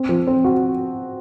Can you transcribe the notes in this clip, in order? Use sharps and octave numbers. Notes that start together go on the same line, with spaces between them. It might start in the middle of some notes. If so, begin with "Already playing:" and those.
Already playing: C4
F3
C4
F#4